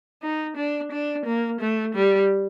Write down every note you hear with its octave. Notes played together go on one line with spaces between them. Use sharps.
D#4
D4
D4
A#3
A3
G3